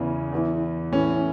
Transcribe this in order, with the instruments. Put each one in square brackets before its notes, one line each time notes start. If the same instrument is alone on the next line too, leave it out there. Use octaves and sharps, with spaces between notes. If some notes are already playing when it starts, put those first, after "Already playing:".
Already playing: [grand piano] E2 C#3 E3
E2 E3
A2 E3 C#4